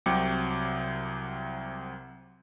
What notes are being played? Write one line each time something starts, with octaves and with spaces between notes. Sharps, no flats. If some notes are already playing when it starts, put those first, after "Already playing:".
C2 C3 F#3 G5 D6 C#7